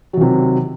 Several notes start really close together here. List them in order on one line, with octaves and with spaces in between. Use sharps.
F#3 D#3 C3